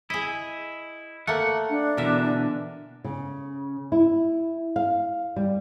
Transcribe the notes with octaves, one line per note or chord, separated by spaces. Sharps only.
E4 G#4 D#5
A3 A#3 F#5
D4
B2 D3 E3 A#4 E5
C#3
E4
F5
G3